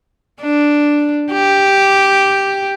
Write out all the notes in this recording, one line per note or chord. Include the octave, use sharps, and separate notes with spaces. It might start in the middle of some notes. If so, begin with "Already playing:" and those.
D4
G4